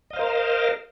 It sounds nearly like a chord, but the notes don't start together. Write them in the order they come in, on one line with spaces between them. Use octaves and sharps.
D#5 F5 C5 A#4